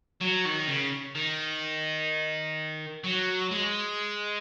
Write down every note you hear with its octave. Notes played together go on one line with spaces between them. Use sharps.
F#3
D#3
C#3
D#3
F#3
G#3